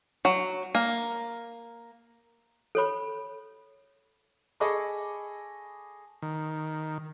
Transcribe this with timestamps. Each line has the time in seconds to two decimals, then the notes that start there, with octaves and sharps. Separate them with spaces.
0.25 F#3
0.75 A#3
2.75 A4 C#5 B5
4.60 G#4 A4 D#5 B5 C#6 D6
6.22 D#3